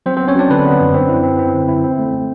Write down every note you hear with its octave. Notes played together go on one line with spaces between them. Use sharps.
F#3 C4 C5
C4 C5
B3
C#4 C#5
F#3 D4 D5
D3 B4
B3
F#2
C4
E4
C4
C4
D3
E4
C4
A3
A3